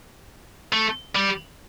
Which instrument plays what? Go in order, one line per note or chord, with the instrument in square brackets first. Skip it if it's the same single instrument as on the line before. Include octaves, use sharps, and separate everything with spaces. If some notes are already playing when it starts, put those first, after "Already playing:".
[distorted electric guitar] A3
G3